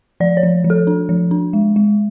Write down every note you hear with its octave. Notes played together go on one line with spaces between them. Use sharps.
F3 D5
C#5
F3
F3
A4
D4
F3
D4
G#3
G#3